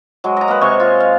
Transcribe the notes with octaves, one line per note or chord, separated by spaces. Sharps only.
F#3 G#3
D#5 A#5
A#3 B4
C3 G#3 C#5 C#6
F4
F5